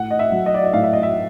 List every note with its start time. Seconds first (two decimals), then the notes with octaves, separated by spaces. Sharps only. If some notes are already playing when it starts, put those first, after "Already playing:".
Already playing: A2 F#5
0.11 D#5
0.19 E5
0.32 F#3
0.46 D#5
0.54 D5
0.64 D#5
0.73 A2 F5
0.83 E5
0.93 D#5
1.03 E5